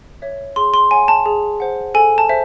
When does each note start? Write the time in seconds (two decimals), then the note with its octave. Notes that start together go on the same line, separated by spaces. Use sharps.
0.22 C#5 E5
0.56 G#4 C6
0.74 C6
0.91 C#5 F#5 G#5
1.08 A5
1.26 G#4
1.60 C5 F#5
1.95 A4 G#5
2.18 A5
2.29 C5 E5